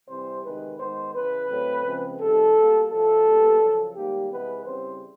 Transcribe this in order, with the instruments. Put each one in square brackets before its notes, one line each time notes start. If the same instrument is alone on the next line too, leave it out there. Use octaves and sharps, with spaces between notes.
[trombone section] C3 E3 G3 C4 C5
E2 C3 D#3 G#3 B4
G#2 D#3 G#3 B3 C5
E2 C#3 E3 B4
A2 F#3 A3 C4
C#3 F3 G#3 C4
F2 C3 D#3 G3 A4
B2 G3 A#3
A2 F3 A3 A4
A#2 G3 B3
F#2 C#3 F3
G#2 D#3 G3 A#3 G4
C3 E3 G#3 B3 B4
C#3 E3 G3 C4 C5